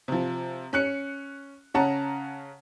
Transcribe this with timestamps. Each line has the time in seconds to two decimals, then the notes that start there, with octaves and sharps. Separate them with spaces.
0.08 C3 F3
0.73 C#4 F#6 C#7
1.74 C#3 C#4 F#5 A5 A#5